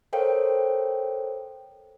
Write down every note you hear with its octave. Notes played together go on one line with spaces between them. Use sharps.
A4 A#4 C5 C#5 F5 G5